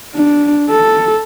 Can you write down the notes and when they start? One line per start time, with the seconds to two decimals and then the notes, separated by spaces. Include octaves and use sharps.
0.16 D4
0.70 A4